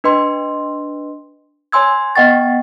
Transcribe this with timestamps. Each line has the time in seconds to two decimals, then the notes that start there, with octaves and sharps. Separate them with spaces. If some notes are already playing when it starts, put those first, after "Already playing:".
0.04 D4 B4 D#5 C6
1.72 C#5 G#5 C6 E6 G#6
2.16 B3 D#5 F#5 G5 C#6 A6